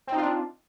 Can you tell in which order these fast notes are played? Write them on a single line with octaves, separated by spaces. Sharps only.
C4 D#4 F4 D4